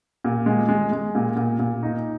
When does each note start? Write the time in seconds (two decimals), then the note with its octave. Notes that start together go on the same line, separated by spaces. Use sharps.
0.24 A#2
0.46 G#3
0.69 G#3
0.92 G#3
1.15 A#2
1.36 A#2
1.59 A#2
1.83 D#4